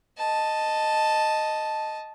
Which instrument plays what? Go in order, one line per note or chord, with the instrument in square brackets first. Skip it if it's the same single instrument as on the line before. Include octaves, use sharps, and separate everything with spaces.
[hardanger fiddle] D#5 A5